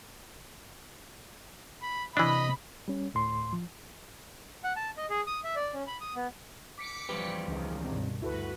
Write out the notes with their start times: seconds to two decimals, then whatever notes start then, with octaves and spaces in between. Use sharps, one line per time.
1.82 B5
2.17 C3 E3 D4 D#5 B5
2.88 G3 C#4
3.14 D2 A2 C6
3.53 F3
4.64 F#5
4.76 A5
4.97 D#5
5.10 G#4
5.27 D#6
5.44 E5
5.56 D5
5.74 C#4
5.87 B5
6.01 D#6
6.15 B3
6.78 D6 B6 C#7
7.09 E2 F3 G3 G4 B4
7.47 C#2 D#3
7.85 G2 B2 C4
8.22 D2 G2 E4 F#4 A4 B4